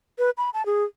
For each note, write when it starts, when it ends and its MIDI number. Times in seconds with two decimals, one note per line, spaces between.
0.19 0.30 71
0.38 0.50 83
0.54 0.65 81
0.66 0.84 68